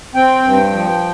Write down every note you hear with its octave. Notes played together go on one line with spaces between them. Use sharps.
C4 G5
G2
F3